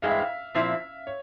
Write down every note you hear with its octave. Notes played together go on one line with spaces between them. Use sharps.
G2 E3 G#3 C4 E4 F5
E5
F5
A#2 F3 C4 E4 E5
C#5